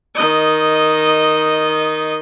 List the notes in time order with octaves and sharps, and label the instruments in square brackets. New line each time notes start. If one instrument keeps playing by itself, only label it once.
[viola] D#3 D#5